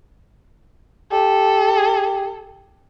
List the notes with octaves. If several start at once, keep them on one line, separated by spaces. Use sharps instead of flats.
G4 A4